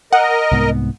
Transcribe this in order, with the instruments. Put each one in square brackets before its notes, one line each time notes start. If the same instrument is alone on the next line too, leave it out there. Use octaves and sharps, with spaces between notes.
[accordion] A#4 D#5 [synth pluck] F#5
[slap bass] C2 G#2 B3